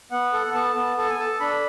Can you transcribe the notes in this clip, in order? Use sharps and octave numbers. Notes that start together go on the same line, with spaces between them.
B3 F#5
A4
B3 A5
B3
A4 A5
G#5
A4 A5
D4 B5